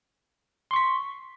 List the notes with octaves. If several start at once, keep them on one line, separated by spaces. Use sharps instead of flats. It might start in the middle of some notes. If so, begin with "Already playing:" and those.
C6 C#6 B6